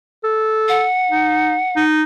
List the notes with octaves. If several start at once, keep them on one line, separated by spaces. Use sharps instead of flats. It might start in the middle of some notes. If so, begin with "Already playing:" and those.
A4
F#5
D#4
D#4